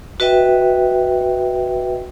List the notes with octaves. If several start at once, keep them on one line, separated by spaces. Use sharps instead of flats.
F#4 B4 D#5 E5 G5